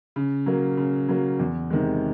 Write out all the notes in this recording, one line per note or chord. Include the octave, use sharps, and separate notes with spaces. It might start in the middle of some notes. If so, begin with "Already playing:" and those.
C#3
F#3 A#3
C#3
F#3 A#3
E2
C3 D#3 G#3